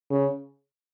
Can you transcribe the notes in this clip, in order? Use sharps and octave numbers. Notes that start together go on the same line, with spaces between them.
C#3